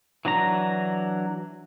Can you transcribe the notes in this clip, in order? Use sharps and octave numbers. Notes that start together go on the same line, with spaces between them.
E3 F#3 D4 A#5